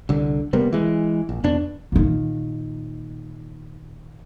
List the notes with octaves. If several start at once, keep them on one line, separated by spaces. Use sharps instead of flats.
C2 D3
C3 G3 A#3 B3
E3 G#3
A#1
F2 B2 D4
A#2 D#3